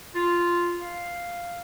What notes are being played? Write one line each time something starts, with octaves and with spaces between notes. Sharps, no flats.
F4
F5